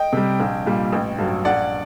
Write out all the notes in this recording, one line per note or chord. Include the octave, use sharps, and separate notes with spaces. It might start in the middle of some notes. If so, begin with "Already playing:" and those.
Already playing: D#5 G5
C3 G3
A#1
A#2 G3
A1
G2 F#3
A#1 D5 F#5